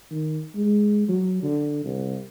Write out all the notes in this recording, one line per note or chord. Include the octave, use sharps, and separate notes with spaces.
D#3
G#3
F#3
D3
C2